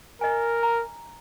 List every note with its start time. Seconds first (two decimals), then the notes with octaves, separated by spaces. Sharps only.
0.21 A#4 D#5 G#5
0.63 A#5